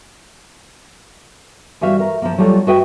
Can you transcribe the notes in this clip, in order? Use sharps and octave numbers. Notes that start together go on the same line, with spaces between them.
E3 G3 F#4 E5 F5
A#4
F3 A#3
F#3 G3 A3 A#3 C4 F4
F#4 B4 D#5 E5 G5